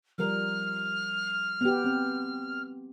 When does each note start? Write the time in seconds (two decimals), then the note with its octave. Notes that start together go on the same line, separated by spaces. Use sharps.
0.18 F3 G3 A#4 F6
1.61 B3 G4
1.85 C4